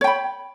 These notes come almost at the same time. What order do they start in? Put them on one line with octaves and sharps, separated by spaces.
C#5 G5 B5